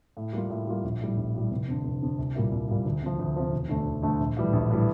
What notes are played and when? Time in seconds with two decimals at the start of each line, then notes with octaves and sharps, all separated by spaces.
0.17 A2
0.33 G3 A#3 F4
0.50 A2
0.67 G3 A#3 F4
0.84 A#1
1.01 A2 G3
1.17 A#1
1.35 A2 G3
1.51 F1
1.68 F2 D3
1.84 F1
2.02 F2 D3
2.18 C2
2.35 A#2 G3 A#3 E4
2.52 C2
2.69 A#2 G3 A#3 E4
2.85 D2
3.02 C3 F3
3.19 D2
3.36 C3 F3
3.52 E1
3.69 D2 D3 A3 D4
3.86 E1
4.03 D2 D3 A3 D4
4.20 A#1
4.37 A2 E3 G3
4.53 A#1
4.70 A2 E3 G3